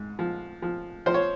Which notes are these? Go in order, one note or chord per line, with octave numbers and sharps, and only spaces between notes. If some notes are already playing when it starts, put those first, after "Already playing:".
Already playing: G#2
F3
F3
F3 C5
C#5